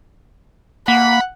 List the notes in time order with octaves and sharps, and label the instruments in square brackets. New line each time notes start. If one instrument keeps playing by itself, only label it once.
[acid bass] A#3 [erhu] F#5 [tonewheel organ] B5